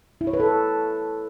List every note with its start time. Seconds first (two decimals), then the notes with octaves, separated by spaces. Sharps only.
0.21 E4
0.27 C#5
0.33 B4
0.40 A4